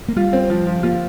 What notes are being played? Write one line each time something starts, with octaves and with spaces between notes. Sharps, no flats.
A#3
G3 F4
C4
F3
F3
A#3 F4